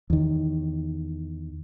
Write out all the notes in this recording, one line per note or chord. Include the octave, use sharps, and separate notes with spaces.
E2 D#3